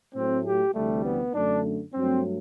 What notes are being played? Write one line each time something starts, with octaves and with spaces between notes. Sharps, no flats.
A2 F#3 A3 C4
G4
D2 C3 E3 G3 A3
B3
F#2 D3 A3 D4
G2 F#3 A3 C4